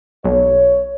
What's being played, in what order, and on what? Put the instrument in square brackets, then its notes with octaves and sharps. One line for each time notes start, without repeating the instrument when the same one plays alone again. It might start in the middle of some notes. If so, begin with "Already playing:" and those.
[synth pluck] B1 [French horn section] C#5